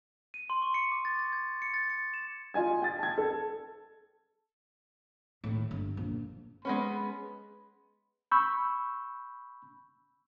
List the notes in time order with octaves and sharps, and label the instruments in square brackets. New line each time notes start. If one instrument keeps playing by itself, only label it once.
[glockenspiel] D#7
C6
C#6
C#7
D6
A6
A6
G#6
C#7
A6
C#7
E7
[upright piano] F4 D#5 G#5 G#6
G5 A6
A5 G#6
A4
[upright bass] A2 D#3
G1
A#1 D3
[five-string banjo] G#3 B3 C#4 [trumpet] B5
[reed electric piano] B5 C#6 E6 G6